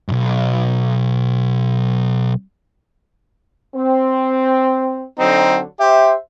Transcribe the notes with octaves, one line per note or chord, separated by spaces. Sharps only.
B1 F#2
C4
D3 F#3 C4 D#4
G4 C5 E5